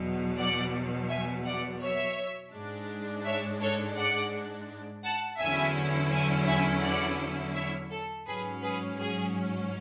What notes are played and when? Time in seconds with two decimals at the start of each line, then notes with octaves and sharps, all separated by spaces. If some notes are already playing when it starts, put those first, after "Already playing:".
Already playing: E2 B2 F#3
0.37 D5 F#5
1.09 E5 G#5
1.45 D5 F#5
1.81 C#5 E5
2.53 G#2 G#3 D4
3.25 C#5 E5
3.61 A4 C#5
3.97 D5 F#5
5.04 F#5 A5
5.39 E2 D3 F#3 C#4 E4 E5 G#5
6.12 E5 G#5
6.47 E5 G#5
6.83 D5 F#5
7.55 C#5 E5
7.91 A4
8.27 G#2 F#3 C#4 G#4 B4
8.63 G#4 B4
8.99 G#4